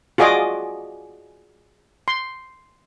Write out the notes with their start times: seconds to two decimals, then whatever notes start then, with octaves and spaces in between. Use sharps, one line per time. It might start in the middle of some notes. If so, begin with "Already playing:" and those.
0.18 F4 F#4 G#4 D5 D#5 D6
2.08 C6